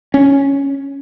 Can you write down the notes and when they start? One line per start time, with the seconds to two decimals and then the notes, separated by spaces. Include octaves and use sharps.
0.14 C#4